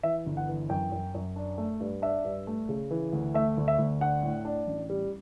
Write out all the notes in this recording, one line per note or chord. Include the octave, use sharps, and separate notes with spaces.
E3 E5
G1
F#5
E3
F#2 G5
F#2
F#2
D4
A3
G2
D4 E5
G2
A3
C#3
E3
D2
A3 E5
D2
E5
D2
D4 F#5
A2
D4
A1
G3